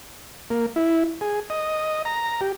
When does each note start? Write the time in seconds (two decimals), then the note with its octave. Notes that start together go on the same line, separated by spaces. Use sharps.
0.50 A#3
0.76 E4
1.21 G#4
1.50 D#5
2.05 A#5
2.41 G4